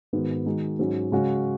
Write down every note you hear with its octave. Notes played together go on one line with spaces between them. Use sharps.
G#2 D#3 B3 F#4
D#3 G#3 D#4 F#4
G#2 F#3 C#4
C#3 G#3 C#4 F#4